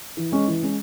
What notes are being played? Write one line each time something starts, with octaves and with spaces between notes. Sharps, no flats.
E3
G#3 C#4
E3
G#3 C#4